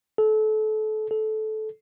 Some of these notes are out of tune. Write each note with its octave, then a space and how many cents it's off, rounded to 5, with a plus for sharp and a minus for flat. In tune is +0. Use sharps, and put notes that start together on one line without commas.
A4 -30
A4 -20